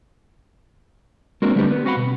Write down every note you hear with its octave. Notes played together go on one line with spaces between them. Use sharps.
G#3 A#3 C4 D4 F#4 A#4
D3 G3 A3 D4 G4 B4
B3
C4 F#4 B4 F5 F#5 B5
B2